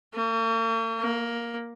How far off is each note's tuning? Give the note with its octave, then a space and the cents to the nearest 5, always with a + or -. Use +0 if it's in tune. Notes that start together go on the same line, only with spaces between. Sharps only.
A#3 -45
A#3 +10